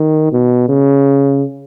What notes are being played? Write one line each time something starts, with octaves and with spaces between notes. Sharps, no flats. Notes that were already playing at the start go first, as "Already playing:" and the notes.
Already playing: D#3
B2
C#3